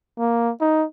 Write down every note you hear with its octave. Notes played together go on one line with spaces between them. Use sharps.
A#3
D#4